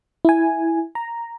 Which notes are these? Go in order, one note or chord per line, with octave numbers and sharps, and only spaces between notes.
E4 G#5
A#5